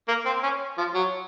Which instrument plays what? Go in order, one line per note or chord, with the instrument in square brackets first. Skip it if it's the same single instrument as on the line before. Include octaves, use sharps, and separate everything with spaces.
[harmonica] A#3
C4
C#4
F3
F#3